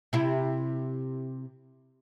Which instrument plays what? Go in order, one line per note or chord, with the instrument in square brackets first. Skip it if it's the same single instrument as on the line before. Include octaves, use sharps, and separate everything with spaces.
[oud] C3 E4